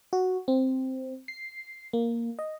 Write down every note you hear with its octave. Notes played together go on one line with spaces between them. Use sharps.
F#4
C4
C7
A#3
D#5